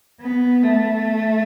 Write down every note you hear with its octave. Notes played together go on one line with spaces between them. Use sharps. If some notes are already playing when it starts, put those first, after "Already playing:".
B3
A3